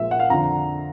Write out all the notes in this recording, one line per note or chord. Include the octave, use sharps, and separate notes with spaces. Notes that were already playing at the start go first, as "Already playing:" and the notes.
Already playing: A#1 A#2 F3 G#3 E5
F#5
F5
F2 D3 F3 A#5